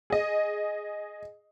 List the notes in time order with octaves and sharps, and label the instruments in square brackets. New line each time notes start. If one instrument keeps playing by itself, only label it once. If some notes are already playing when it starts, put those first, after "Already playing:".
[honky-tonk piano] G#4 D#5